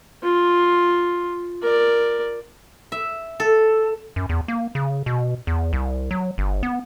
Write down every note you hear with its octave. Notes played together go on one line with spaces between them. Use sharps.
F4
A#4 D5
E5
A4
F#2
E2
A#3
C#3
B2
E2
C2
F#3
G1
B3